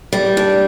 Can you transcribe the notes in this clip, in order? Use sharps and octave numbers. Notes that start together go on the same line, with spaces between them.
G3
D4